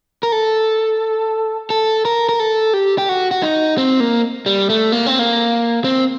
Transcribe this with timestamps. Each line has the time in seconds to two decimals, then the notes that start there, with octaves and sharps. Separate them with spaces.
0.23 A#4
0.32 A4
1.70 A4
2.05 A#4
2.29 A#4
2.40 A4
2.73 G4
2.98 G4
3.09 F#4
3.31 F#4
3.42 D#4
3.78 C4
4.00 A#3
4.46 G3
4.70 A3
4.92 A#3
5.06 C4
5.19 A#3
5.84 C4